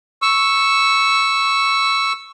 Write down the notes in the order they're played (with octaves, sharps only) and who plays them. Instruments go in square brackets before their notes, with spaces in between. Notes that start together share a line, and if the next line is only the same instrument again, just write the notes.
[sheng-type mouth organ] C#6 E6